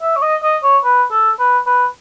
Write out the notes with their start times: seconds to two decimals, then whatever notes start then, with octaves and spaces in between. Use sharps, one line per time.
0.01 E5
0.16 C#5
0.22 D#5
0.43 D#5
0.63 C#5
0.84 B4
1.11 A4
1.39 B4
1.66 B4